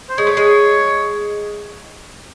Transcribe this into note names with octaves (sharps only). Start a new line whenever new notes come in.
C5
G#3 C#5
A3
G#3